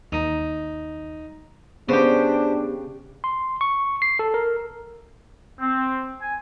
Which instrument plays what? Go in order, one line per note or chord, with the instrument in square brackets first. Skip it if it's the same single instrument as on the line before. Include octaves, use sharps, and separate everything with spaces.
[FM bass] D#2 [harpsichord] D#4
[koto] C#3 G4 [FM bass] B3 [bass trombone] D4 [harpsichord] C5
[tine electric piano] C6
C#6
C7
A4
A#4
[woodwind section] C4
G#5